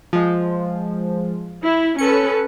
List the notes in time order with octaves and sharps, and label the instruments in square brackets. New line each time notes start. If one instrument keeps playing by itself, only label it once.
[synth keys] F3 G#3
[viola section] E4
[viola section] C#4 A4 B4 [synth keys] C#7